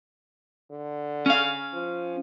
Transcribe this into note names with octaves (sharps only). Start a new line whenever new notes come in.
D3
C#4 F5
F3